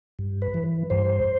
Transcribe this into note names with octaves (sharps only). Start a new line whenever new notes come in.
G2
B4
E3
G2 C5